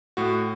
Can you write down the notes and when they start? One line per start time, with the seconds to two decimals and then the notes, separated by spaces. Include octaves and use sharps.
0.17 A2 F#4